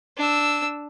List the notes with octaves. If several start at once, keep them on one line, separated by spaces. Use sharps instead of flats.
D4 E6